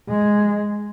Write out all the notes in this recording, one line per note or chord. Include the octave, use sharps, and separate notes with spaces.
G#3